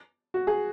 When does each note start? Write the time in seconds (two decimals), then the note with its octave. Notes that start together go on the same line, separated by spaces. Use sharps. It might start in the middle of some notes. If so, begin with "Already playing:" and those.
0.34 F#4
0.47 G#4